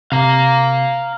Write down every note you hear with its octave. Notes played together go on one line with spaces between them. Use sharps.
C3 F5 A#5